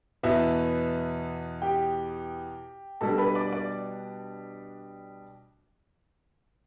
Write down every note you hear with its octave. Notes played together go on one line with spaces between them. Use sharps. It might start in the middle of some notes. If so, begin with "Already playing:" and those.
E2 B2 B3 E5
G4 G5
B2 G3 D4 A4 A5
B4 B5
D5 D6
D5 D6